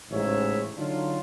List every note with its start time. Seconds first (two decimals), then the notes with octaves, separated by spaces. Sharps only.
0.11 A1 G#2 C#3 G#3 C#5 E5
0.77 D3 F#3 D4 D#4 F4